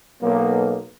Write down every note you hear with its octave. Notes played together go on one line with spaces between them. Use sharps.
B1 A#3